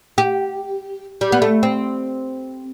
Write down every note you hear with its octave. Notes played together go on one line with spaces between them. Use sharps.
G4
G3
B3
A3
C4